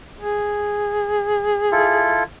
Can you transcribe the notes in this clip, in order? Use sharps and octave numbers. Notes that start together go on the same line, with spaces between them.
G#4
E4 F4 A4